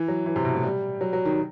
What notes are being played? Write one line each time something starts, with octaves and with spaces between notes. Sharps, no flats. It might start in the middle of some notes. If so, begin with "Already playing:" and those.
Already playing: E3
F#3
E3
C3
B2
A2
G3
F#3
F#3
D#3